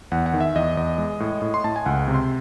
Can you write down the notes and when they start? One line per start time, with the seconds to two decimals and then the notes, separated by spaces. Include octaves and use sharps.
0.12 E2 F#5
0.26 F#5
0.33 D#3
0.40 E5
0.55 E2 D#5
0.77 E2 D#5
0.98 G#3
1.20 A2
1.42 A2
1.54 C6
1.64 A2 A5
1.76 G#5
1.86 C#2 F#5
2.08 C3
2.14 C6